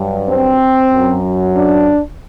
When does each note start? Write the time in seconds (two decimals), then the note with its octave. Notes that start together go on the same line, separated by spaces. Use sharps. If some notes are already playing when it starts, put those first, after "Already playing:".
Already playing: G2 F#3
0.29 C4
0.93 F#2 F#3
1.55 D4